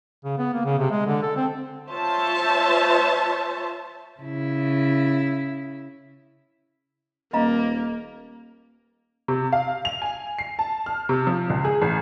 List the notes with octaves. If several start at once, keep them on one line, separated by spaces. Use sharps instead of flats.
C#3
B3
A#3
C#3
C3
G#3
D3
A4
C4
F4 C5 C#5 E5 A5
C#3 E4
D#1 A#3 D#5 F5 A#5
C3
F5
F7
G#5
C7
A5
F6
C3
F3
C#2
G#4
A1